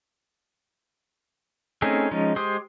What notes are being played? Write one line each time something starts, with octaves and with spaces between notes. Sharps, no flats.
A3 C4 C#4 D#4 G#4
F3 G#3 C#4 D#4
G#3 G4 C5 C6 D#6